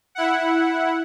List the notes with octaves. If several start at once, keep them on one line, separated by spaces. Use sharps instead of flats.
E4 F#5